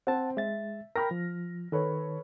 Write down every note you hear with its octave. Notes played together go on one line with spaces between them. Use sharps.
C4 F#5 A5
G#3 E5 A6
A#4 G5 B5 F6 A#6
F3
D#3 A4 B4 C#5